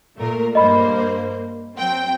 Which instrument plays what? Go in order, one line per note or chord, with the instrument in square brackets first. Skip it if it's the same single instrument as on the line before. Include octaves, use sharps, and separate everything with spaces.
[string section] A#2 A3 A#4
[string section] G2 A#3 C5 [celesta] D#5 B5
[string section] F#3 C4 G5